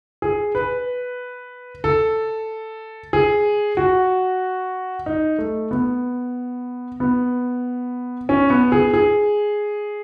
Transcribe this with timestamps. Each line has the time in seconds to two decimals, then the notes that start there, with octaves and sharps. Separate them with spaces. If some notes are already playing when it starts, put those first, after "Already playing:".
0.22 G#4
0.55 B4
1.84 A4
3.13 G#4
3.77 F#4
5.06 D#4
5.39 A3
5.71 B3
7.00 B3
8.29 C#4
8.50 B3
8.72 G#4
8.94 G#4